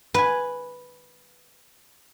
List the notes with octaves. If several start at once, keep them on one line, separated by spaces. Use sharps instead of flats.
B4 G#5